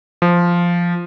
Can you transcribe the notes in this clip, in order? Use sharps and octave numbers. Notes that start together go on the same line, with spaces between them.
F3